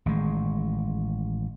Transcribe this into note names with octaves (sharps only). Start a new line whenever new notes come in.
A1 D#3 G#3